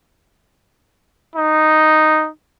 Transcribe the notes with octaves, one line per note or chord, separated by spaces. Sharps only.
D#4